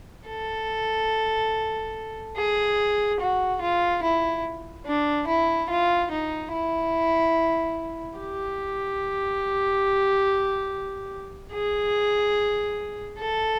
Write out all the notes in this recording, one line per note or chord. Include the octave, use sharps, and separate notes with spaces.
A4
G#4
F#4
F4
E4
D4
E4
F4
D#4
E4
G4
G#4
A4